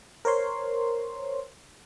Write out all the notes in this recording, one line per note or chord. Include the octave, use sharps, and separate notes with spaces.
A#4 C5 C#5 C6